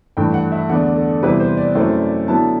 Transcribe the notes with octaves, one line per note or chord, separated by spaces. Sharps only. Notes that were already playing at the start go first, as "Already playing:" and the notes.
G2 E3 A3 G5
F#5
E5
E2 D3 A3 D4 F#5
A4
E2 C3 G3 C4 E4 B4
C5
D5
F#2 F#3 A3 C4 E4
D3 F#3 B3 E4 A5